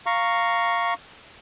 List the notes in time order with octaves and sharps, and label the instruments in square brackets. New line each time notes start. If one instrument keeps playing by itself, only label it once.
[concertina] F5 A#5 C#6